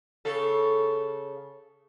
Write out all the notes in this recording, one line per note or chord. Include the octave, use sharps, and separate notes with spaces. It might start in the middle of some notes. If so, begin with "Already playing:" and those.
C#3 A4